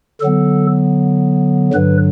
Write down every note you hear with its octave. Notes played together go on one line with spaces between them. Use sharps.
D3 F#3 B3 A4
G2 D3 F#3 B4